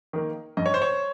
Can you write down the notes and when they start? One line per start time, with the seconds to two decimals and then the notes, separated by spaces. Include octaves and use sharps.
0.13 D#3 A#3
0.57 G2 D#5
0.66 C#5
0.74 C5
0.82 C#5